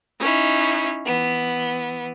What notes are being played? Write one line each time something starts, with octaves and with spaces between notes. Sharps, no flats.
C#4 D#4 E4
E3 B3